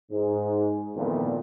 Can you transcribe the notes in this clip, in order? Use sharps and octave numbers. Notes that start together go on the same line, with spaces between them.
G#2
F2 A#2 D#3 E3 A3 B3